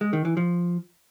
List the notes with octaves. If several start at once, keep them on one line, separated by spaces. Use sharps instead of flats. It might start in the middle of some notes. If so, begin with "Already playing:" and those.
G#3
D#3
E3
F3